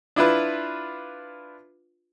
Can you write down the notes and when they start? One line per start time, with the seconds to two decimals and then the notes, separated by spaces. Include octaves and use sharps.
0.16 D4 E4 F4 B4